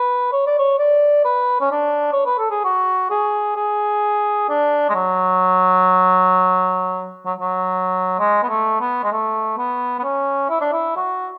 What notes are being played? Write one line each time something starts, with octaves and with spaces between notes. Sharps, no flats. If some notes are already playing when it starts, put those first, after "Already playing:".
Already playing: B4
C#5
D5
C#5
D5
B4
C#4
D4
C#5
B4
A4
G#4
F#4
G#4
G#4
D4
G#3
F#3
F#3
F#3
G#3
B3
A3
B3
G#3
A3
B3
B3
C#4
E4
D4
E4
F#4